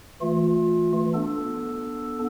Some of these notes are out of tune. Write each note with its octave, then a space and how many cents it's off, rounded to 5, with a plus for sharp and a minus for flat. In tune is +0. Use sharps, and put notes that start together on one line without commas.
E3 +0 A3 +0 F4 +30
B3 -25 D4 +0 A4 +0